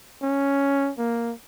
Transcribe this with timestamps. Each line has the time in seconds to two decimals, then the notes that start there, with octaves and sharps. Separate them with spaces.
0.22 C#4
0.98 A#3